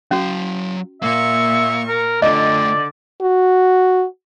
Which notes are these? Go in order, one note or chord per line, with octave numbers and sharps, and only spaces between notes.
F#3 C#4 F#4 F5
A#2 A#3 E5 C#6
A#4
D3 A3 F4 D5 D#5
F#4